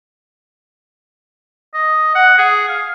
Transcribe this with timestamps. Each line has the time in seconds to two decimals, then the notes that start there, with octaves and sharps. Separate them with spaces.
1.74 D#5
2.15 F#5
2.38 G#4
2.69 F5